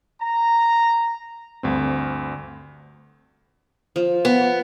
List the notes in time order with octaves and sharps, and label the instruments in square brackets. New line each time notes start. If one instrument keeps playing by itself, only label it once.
[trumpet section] A#5
[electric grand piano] D2 G2 C4
[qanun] F3
[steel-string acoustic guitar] B3